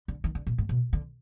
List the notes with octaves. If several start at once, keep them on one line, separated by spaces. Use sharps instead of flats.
D3
D#3
D3
A#2
G#2
B2
D3